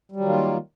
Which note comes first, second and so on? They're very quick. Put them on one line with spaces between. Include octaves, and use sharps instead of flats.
G3 F#3 D#3 F4 A#3